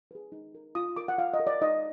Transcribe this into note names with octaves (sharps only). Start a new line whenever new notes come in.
G#4 B4
D#4
A#4
F4 D#6
A#4 D6
F#5
F4 F5
D#5
A#4
D5
D#4 D#5